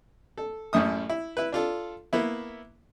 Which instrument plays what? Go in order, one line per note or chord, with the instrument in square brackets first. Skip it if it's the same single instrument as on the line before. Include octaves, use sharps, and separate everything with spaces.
[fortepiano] A4
A1 F#2 A2 E5 D#6
E4
E4 B4
D4 F4 A4
A#3 B3 E4